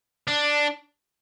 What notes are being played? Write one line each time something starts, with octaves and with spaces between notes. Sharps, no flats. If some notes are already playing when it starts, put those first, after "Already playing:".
D4